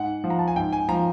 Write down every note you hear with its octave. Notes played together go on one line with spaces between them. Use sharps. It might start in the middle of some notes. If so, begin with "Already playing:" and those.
Already playing: G#2 F#5
F3
A#5
A5
G#5
G#2 G5
G#5
F3 A#5